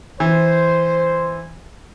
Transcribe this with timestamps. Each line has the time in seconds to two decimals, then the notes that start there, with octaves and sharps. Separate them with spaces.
0.20 E3 C5